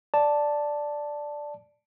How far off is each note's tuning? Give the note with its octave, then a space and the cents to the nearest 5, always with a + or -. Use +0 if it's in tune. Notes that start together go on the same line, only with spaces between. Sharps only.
D5 +0 A5 +0